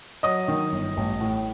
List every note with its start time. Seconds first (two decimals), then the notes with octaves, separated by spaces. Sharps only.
0.23 F#3 D#5 D#6
0.48 D#3
0.72 G1
0.97 A1
1.21 A2